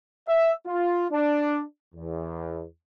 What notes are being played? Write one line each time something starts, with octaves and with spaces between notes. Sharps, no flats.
E5
F4
D4
E2